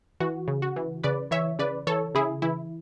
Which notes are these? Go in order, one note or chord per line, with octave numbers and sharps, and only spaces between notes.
E3 F#4
C#3
F#4
E3
C#3 B4 D5
E3 C#5 E5
C#3 B4 D5
E3 A4 C#5
C#3 E4 G#4
E3 E4